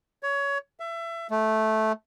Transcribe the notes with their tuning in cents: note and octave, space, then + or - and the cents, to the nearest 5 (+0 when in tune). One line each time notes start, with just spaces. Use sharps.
C#5 +20
E5 +25
A3 -10